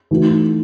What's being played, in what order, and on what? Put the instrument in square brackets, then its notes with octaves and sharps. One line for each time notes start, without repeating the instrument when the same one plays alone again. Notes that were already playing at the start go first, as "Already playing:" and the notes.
[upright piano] E3 A3 D#4 F#4